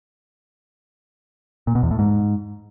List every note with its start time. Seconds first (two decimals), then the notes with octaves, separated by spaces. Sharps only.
1.67 A#2
1.75 B2
1.83 E2
1.91 A2
1.99 G#2